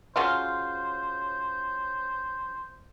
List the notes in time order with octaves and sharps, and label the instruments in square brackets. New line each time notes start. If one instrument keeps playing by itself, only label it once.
[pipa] C#3 F#3 F4 [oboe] C5